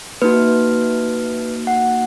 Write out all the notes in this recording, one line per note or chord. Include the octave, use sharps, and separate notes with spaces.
A#3 D#4 F#4 B4
F#5